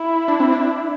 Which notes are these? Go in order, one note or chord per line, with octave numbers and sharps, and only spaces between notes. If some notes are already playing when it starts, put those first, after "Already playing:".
Already playing: E4
D4
C4
D4